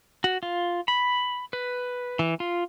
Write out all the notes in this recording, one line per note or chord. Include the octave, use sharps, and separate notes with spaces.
F#4
F4
B5
B4
E3
F4